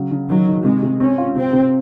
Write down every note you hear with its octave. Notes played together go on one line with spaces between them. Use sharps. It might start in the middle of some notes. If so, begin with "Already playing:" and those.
Already playing: C#3 F#3
C#3
D#3 F#3
D#3
C3 G#3
C3
C4 C#4
F4
C3 C4
C3